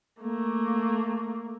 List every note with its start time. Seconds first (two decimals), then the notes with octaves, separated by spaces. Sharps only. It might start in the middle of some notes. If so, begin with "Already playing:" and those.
0.21 A3 A#3